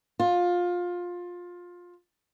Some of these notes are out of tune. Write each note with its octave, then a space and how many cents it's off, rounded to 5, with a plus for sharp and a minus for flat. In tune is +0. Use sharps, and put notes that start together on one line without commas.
F4 +20